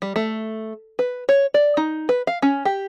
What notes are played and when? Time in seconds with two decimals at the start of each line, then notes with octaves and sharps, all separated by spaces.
0.02 G3
0.16 A3
0.99 B4
1.29 C#5
1.54 D5
1.77 D#4
2.09 B4
2.27 F5
2.42 C#4
2.65 G4